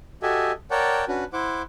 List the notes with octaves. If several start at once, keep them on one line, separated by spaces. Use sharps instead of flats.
F#4 G4 A4 D#5 E5 G#5
A#4 C#5 D5 F#5 G5 A5
C#4 D4 F#4 B4
E4 C5 F#5 D6